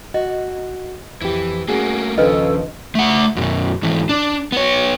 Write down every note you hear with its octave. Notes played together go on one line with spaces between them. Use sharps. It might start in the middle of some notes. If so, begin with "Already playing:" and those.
F#4 D#5
F2 E3 G4
A3 A#3 C#4 F#4 G#4
D#2 C#3 F3 D4 F4 A4 B4 D#5
A3 F#5
F#2 B2
G#2 E3
D4
B3 C#5